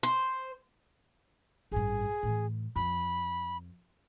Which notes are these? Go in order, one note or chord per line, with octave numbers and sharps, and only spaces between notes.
C5
A1 G2 G#4
A2 E3
F2 B5